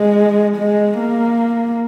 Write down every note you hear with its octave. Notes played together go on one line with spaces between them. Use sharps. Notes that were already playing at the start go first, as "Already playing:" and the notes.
Already playing: G#3
G#3
A#3